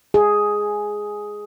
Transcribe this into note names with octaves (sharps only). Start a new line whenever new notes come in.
G#4